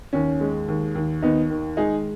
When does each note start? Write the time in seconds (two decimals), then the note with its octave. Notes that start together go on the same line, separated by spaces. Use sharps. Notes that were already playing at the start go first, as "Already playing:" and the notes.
0.13 D#2 C#4
0.40 G#3
0.68 D#2
0.95 D#2
1.22 D#2 B3 D#4
1.50 D#3
1.77 G#3 D#4 G#4